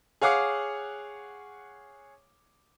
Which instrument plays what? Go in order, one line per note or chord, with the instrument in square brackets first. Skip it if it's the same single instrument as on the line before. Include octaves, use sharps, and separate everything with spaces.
[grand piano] G#4 C#5 F5 F#5 D6